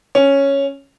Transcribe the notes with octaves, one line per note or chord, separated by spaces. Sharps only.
C#4